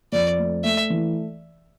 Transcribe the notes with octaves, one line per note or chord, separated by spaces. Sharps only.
F2 D5
A3
A3 E5
E3